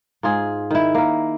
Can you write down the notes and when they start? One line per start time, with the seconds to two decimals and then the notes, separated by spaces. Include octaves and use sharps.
0.23 G#2 F4 G#4
0.70 D#3 E4
0.94 A#3 A#4